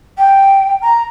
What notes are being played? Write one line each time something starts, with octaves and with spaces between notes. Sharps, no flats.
G5
A#5